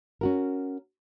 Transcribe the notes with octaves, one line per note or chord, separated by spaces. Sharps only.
C#4 F#4 A#4